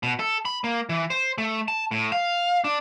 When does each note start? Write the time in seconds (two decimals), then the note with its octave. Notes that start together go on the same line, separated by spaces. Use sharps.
0.03 B2
0.19 A4
0.45 B5
0.64 A#3
0.89 E3
1.10 C5
1.38 A3
1.68 A5
1.91 A2
2.12 F5
2.64 D4